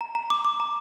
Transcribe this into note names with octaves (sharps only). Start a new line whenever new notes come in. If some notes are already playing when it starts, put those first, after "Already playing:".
A#5
A#5
D6
D6
A#5